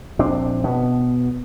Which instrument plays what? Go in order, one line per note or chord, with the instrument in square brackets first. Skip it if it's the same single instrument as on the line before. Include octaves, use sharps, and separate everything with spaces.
[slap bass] A#1 C4 D4
B2 B3